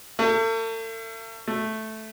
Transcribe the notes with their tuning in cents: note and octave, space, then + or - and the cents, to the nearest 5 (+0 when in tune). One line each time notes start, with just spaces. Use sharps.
A3 +40
A3 -5